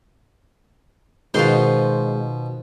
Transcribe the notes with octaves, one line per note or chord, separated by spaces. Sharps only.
B2 D#3 G#3 F4 F#4 C5 C6